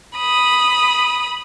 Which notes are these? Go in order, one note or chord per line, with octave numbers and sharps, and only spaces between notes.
B5 D#6